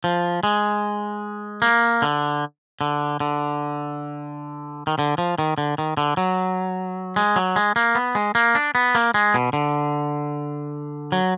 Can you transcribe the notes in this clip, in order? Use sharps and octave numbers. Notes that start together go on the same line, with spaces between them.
F3
G#3
A#3
D3
D3
D3
D#3
D3
F3
D#3
D3
D#3
D3
F#3
G#3
F#3
G#3
A#3
B3
G#3
A#3
D4
B3
A#3
G#3
B2
D3
F#3